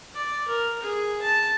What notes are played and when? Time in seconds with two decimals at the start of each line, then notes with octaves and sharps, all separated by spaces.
0.15 D5
0.48 A#4
0.83 G#4
1.22 A5